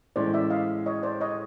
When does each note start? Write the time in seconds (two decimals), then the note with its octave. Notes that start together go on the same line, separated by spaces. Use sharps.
0.16 A2 E3 G#3 C#4 C5 D5
0.34 D5 E5
0.50 D#5 F5
0.86 C#5 D#5
1.03 C5 D5
1.21 C#5 D#5